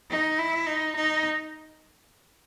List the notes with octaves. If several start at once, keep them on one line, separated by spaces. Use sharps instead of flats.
D#4
E4
D#4
D#4